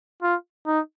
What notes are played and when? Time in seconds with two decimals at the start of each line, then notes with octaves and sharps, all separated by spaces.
0.22 F4
0.66 D#4